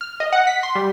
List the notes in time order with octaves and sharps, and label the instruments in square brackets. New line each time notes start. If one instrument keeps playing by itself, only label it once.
[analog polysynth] F6
D#5
F#5
B6
C6
G3